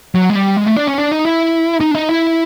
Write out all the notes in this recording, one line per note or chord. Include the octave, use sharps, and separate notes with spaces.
F#3
G#3
G3
G#3
A3
D4
C#4
D4
D#4
E4
D#4
D4
D#4
E4